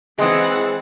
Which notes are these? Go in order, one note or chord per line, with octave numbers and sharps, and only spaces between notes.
E3 G#3 C4 G#4 D#5 F#5 C6 D#6